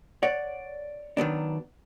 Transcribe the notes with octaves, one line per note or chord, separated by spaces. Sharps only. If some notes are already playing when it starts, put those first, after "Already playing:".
C#5 D5 F#5
D#3 F#3 B3 D4